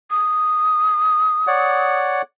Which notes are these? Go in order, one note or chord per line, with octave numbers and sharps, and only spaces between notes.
D#6
C#5 D5 F#5